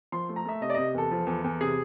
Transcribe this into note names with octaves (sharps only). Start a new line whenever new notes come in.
F3 C6
A3
A#5
A3 E5
C3 D#5
D5
C3 D#5
E2 A4
F3
E2
E2
C3 G#4